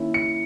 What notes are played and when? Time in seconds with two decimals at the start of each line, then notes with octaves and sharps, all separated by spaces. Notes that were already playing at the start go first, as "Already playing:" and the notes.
Already playing: D#3 A#3 C#4 E4
0.14 C#7